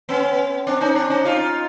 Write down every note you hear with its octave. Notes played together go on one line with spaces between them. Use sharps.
B3 C#4
C4 D4
C#4 D#4
C4 D4
C#4 D#4
D#4 F4